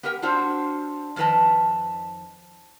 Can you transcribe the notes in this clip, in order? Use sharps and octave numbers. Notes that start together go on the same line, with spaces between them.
B3 G4 A#4 E5 G5
C4 D4 F4 F#4 C5
F2 D#3 F4 B4 D#5 A5